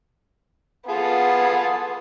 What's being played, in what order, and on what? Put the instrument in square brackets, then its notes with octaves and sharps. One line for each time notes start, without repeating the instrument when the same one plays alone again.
[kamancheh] B3 [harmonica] F4 G#4 A4